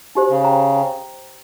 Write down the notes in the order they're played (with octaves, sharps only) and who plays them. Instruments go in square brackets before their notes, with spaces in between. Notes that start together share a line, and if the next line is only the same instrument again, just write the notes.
[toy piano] D#4 G4 C5
[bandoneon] C#3
[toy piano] C5 G5 A#5
C5 G5 A#5